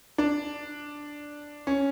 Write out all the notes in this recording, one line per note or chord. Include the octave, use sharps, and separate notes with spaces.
D4
C#4